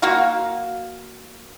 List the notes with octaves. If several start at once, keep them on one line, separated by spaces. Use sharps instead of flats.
A#3 F#4 F5